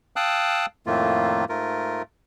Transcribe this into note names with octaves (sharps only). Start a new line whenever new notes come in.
F5 G5 A5 D#6 E6 F#6
F2 A2 D#3 A3 A#3 F4
G#2 A3 F4 A#4